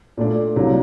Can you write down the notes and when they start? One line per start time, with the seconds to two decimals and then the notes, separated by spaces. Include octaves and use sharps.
0.17 A#2 A3 D4
0.56 C2 C3 F#3 A#3 D4